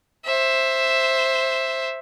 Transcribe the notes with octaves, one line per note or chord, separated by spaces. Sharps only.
C5 E5